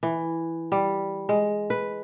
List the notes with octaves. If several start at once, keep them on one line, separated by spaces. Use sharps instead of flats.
E3
G3
G#3
B4